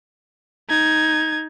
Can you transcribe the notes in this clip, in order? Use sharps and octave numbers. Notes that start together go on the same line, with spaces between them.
D#4 G#6